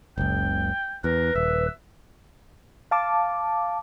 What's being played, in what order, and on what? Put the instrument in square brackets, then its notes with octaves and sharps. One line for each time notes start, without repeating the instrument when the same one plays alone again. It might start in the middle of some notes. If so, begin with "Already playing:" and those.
[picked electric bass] F#1 C#2 [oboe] G5
[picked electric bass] E2 [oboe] A#4 [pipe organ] B4
[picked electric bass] D#1 [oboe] E5
[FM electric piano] F5 A5 D6